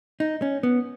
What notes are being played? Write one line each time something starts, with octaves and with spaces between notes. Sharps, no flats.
D#4
C#4
B3